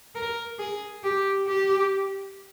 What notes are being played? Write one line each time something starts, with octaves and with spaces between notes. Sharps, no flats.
A#4
G#4
G4
G4